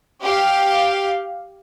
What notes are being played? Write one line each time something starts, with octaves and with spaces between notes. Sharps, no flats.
G4 F5